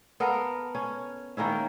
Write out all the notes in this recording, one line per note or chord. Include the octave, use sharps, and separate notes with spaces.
B3 A4 A#4 F5
C#4
D#3 A#3 C#4 E4